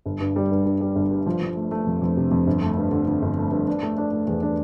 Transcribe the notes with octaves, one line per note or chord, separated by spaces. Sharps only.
G1
G2
G3
G2
G2
G3
G1
G2
F3
F3
A3
A3
F2
F2
C3
F2
G1
A3
G2
D3
D3
G1
A3
G2
D4
A3
D4
A3
E2
D4